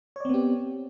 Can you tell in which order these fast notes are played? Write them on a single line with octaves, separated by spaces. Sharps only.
C#5 D5 C4 B3 G4